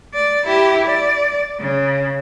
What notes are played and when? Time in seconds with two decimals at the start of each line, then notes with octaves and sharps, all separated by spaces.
0.14 D5
0.44 E4 G4
0.87 D5
1.60 C#3